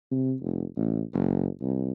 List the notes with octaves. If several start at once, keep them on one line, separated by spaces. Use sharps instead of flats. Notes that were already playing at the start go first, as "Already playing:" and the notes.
C3
F1
A1
F#1
C2